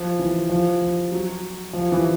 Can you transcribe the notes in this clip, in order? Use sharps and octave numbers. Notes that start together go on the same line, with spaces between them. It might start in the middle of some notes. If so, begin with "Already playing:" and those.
Already playing: F3
E3
F3
F3
F#3
F3
E3